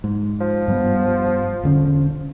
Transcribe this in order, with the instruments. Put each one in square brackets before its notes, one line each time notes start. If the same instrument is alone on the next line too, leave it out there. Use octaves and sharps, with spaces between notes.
[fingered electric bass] G#2
[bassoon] F3
[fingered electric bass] G2 G3 B3
E1 D3 C#4